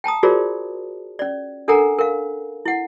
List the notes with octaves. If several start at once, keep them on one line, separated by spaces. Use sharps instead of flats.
G5 A5 A#5 D#6
F4 F#4 G#4 A#4 C5 D5
C#4 D5
D4 A4 A#4 F#5 G#5 A#5
A#4 F5
E4 F#5